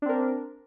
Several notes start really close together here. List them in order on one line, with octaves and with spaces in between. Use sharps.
D4 C4 A#4